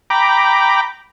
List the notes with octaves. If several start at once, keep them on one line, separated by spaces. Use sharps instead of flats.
G5 A#5 B5 D6